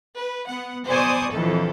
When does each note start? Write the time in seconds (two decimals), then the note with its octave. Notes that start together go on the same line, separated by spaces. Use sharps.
0.18 B4
0.49 B3 F#5
0.87 B2 C5 D5 G#5 C#6 D#6
1.31 A#1 F2 E3 A4